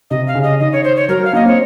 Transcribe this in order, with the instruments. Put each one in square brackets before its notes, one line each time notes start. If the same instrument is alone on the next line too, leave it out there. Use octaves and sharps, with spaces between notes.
[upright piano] C3 [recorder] D#5
[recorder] F5
[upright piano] C#3
[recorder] D#5
[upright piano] D#3 [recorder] D#5
[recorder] C#5
C5
C#5
[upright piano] F#3 [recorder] A#4
[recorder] F5
[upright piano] A#3 [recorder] D#5
[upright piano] C4 [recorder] C#5